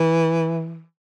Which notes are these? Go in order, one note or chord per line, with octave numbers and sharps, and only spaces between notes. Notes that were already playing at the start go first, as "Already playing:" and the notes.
Already playing: E3